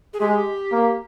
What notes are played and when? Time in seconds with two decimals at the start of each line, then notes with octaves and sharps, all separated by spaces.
0.14 G#4
0.20 G#3 G4
0.72 A#3